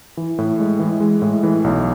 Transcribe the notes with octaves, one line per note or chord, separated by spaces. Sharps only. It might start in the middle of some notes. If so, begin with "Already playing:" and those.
E3
A2
G#3
E3
G#3
A2
E3
B1